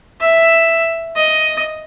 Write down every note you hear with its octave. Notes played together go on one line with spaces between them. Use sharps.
E5
D#5